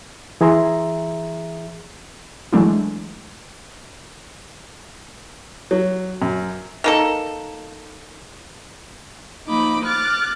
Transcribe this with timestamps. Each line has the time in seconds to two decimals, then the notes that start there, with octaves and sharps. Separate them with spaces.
0.41 E3 G#4 E5 A#5 C6
2.53 E3 F#3 G#3 A3 D4 E4
5.71 F#3
6.22 F#2
6.84 D#3 A#3 A4
9.47 F3 A#3 D#4 B5 D6
9.85 D6 F6 F#6 A6